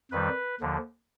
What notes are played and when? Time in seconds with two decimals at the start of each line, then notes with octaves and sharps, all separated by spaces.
0.11 F2 D#3 G3 B4
0.61 D#2 D3 F3